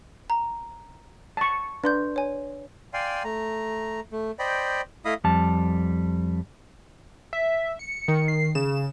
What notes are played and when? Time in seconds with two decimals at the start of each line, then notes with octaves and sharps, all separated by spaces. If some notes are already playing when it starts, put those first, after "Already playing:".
0.30 A#5
1.37 A5 C#6
1.84 D4 B4 C6 G6
2.16 C#5 G#5
2.93 D5 F5 G5 G#5 C6
3.24 A3 A#5
4.12 A3
4.39 C5 D5 D#5 G5 B5
5.05 A3 E4 D#5 F5 B5 D#6
5.24 F2 G3 A5
7.33 E5
7.79 C#7
8.08 D#3
8.28 C7
8.55 C#3 E7